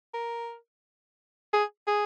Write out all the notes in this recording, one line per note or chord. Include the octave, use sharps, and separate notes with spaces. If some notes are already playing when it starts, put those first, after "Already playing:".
A#4
G#4
G#4